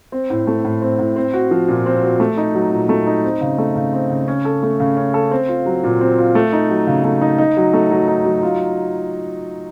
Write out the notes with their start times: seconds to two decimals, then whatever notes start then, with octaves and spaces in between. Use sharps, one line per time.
0.12 C4
0.30 A2
0.47 A3
0.64 A2
0.82 C4
0.98 A2
1.16 C4
1.34 F#4
1.51 F3
1.68 A#2
1.86 C4
2.03 F#4
2.20 A3
2.37 D#4
2.55 F#3
2.72 A#2
2.89 A3
3.07 D#4
3.24 C4
3.41 C#3
3.58 A3
3.75 C#3
3.93 C4
4.10 C#3
4.28 C#4
4.45 A4
4.63 A3
4.80 C#3
4.97 C#4
5.14 A4
5.31 C4
5.48 F4
5.66 F#3
5.84 A#2
6.01 C4
6.18 F4
6.35 A3
6.53 D#4
6.70 F#3
6.87 C#3
7.04 A3
7.22 D#4
7.38 D#4
7.57 F#3
7.73 A3
7.91 F#3
8.08 D#4
8.25 F#3
8.43 F4